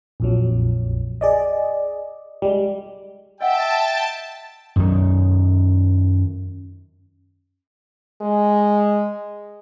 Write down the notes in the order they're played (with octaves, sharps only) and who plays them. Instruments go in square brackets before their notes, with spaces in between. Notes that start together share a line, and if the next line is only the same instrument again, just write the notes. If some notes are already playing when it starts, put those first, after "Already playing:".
[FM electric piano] A#1 F2 F#3
G#4 D5 D#5
G3 G#3
[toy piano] D#5 F#5 [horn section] E5 G5 [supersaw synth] A5
[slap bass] F#2 D#3
[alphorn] G#3